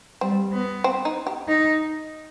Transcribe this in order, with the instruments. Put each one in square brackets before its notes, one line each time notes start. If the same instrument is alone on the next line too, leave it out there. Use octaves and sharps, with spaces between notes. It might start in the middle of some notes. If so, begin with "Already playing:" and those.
[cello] G3 [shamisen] C4
[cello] B3
[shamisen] C4
D#4
G4
[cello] D#4